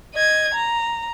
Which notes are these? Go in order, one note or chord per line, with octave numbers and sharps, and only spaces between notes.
D#5 G#6
A#5